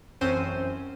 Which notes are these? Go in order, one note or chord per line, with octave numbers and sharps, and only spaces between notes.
A1 F#2 C4 C#4 C5 D#7